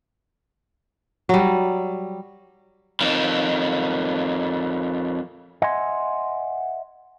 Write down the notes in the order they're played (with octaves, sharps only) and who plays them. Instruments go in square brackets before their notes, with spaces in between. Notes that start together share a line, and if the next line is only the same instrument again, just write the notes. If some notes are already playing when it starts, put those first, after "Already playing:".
[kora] F#3 G3
[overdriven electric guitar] F2 D#3
[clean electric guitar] D#5 E5 F#5 G#5 C6